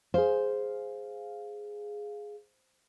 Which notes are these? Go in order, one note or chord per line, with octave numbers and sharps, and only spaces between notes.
G#4 C5 F5